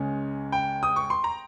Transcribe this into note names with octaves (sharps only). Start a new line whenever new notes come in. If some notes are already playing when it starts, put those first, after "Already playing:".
Already playing: C#2 C#3 G#3 C#4
G5
D#6
C#6
C6
A#5